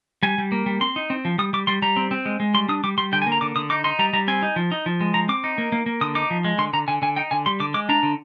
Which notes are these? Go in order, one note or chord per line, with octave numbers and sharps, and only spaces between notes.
G3 G#5
G3
A#3
G3
C4 C6
D#4
C4
F3
G3 D#6
G3 D6
G3 C6
G3 A#5
C4
C4
G#3
G#3
G3 C6
D4 D#6
G3 D6
G3 C6
D3 G5
G#5
A#3
A#5
D3 D6
D3 D#6
D#4 D6
D#4 C6
G3 A#5
G3 A#5
C4 G#5
D#4
F3
D#4
F3
G#3
F3 A#5
C4 D6
D#4
A#3
A#3
A#3
D3 D#6
D#4 D6
F3
G#3
D3 C6
D3 A#5
D3 G#5
D3 G#5
D#4 G5
D3 G#5
G3 C6
D3 D6
G#3 D6
D4 A#5
D3